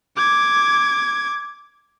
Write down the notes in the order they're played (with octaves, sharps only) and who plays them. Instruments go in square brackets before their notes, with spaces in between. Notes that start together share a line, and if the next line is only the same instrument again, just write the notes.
[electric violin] D6 G#6